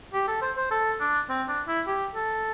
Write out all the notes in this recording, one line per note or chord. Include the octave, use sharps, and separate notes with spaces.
G4
A4
C5
C5
A4
D4
C4
D4
E4
G4
A4